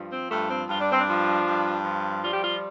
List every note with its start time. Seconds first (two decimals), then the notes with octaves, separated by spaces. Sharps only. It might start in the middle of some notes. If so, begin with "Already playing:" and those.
Already playing: G2 F3
0.12 C4
0.31 G2 A3
0.50 C4
0.69 G2 F4
0.80 D4
0.91 C4
1.01 D4
1.08 F3
1.47 G2
1.84 F3
2.22 G3 F4
2.33 G4
2.44 F4